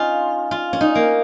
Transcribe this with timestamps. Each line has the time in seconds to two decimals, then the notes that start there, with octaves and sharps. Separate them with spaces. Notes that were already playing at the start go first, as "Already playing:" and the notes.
Already playing: C#4 D#4 F4
0.51 F4
0.73 C#4
0.81 D#4
0.95 A#3